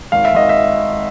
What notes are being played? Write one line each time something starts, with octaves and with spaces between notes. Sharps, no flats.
G#1 F5
E5
G#1 D#5
E5